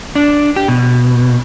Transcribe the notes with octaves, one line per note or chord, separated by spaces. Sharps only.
D4
G4
B2